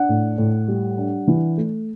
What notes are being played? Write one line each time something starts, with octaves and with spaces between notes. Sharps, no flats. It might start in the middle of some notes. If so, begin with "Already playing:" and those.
Already playing: D4 F#5
A2
A2
G3
D4
E3
A3